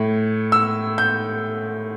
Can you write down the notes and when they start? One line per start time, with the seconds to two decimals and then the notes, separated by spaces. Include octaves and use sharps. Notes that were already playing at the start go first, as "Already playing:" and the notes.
Already playing: A2 A3
0.52 E6
0.98 G6